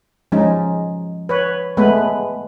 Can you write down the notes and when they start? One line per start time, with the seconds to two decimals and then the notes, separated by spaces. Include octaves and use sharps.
0.32 F3 G#3 C#4 D#4
1.29 B4 C#5
1.77 G#3 A3 B3 B4